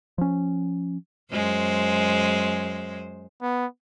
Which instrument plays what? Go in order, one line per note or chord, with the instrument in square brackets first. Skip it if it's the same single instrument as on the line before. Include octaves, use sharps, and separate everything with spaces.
[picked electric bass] F3 C#4
[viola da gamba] F#2 G#3 C5
[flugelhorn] B3